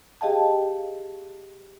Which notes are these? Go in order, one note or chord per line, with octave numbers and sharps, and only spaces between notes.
G4 G#4 D#5 F5 G5 A5